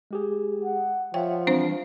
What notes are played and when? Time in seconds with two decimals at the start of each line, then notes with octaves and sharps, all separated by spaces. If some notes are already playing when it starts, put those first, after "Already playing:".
0.11 G#3 G4 G#4
0.64 F#5
1.14 F3 C#5 E5 F#5 G5
1.47 E3 G3 C4 D4 C5